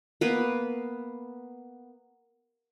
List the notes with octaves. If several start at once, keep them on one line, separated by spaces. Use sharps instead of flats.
A#3 B3 B4